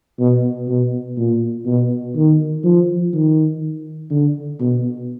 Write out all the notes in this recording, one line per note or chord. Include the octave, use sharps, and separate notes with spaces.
B2
B2
A#2
B2
D#3
F3
D#3
D3
B2